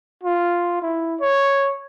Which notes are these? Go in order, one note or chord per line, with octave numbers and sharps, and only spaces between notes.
F4
E4
C#5